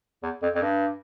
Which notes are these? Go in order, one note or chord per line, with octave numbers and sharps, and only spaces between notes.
E2
F2
F2
G2